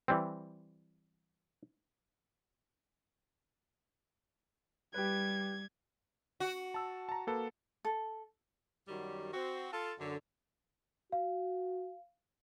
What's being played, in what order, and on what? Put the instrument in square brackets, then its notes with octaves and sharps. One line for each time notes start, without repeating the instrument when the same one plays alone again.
[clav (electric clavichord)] E3 G3 C4
[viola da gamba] G3 [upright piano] G4 B4 [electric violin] G#6
[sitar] F#4
[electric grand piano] A5 E6
A5 A#5
A#3 A4 B4
[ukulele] A4
[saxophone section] F#2 D#3 F#3 G3
C4 F#4
F4 A4
F#2 D3
[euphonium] F#4 [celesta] F5